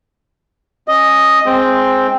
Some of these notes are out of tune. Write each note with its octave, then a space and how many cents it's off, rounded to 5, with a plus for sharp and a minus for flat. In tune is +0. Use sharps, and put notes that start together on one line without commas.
C#4 -10 D#5 +0
G#3 +0 C4 +0 G5 +0